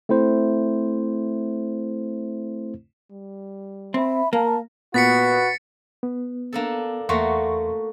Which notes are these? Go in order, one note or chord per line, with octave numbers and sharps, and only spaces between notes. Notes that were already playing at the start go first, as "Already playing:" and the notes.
A3 C4 E4 C5
G3
C4 E5 B5
A#3 A#4 F5 A5 A#5
A#2 B3 F#4 B4 A6 B6 C#7
B3
A#3 D4 A4
E2 A3 A#3 F#4 C6 C#6